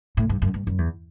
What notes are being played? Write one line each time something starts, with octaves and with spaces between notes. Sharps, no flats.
A2
G2
F#2
G2
F#2
E2